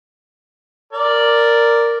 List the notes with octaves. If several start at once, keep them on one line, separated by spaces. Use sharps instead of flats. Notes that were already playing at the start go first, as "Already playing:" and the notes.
A#4 D5